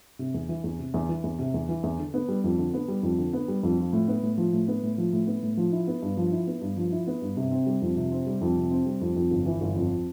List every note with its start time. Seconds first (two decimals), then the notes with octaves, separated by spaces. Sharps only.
0.19 C3
0.34 E2
0.49 E3
0.64 E2
0.79 C3
0.94 E2
1.09 E3
1.24 E2
1.39 C3
1.54 E2
1.69 E3
1.83 E2
1.99 D3
2.14 B3
2.28 G3
2.44 F2
2.58 D3
2.74 B3
2.88 G3
3.03 F2
3.18 D3
3.33 B3
3.48 G3
3.63 F2
3.78 F3
3.93 A2
4.08 B3
4.23 A2
4.38 F3
4.53 A2
4.68 B3
4.83 A2
4.98 F3
5.13 A2
5.27 B3
5.43 A2
5.57 F3
5.72 E4
5.87 B3
6.02 G2
6.17 F3
6.32 E4
6.47 B3
6.61 G2
6.77 F3
6.92 E4
7.07 B3
7.22 G2
7.37 C3
7.52 C4
7.66 G3
7.82 F2
7.97 C3
8.12 C4
8.27 G3
8.41 F2
8.56 C3
8.71 C4
8.86 G3
9.01 F2
9.16 F2
9.31 G1
9.46 E3
9.61 G1
9.76 F2